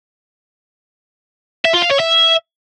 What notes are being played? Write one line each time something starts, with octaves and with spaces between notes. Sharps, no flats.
E5
F4
F5
C#5
E5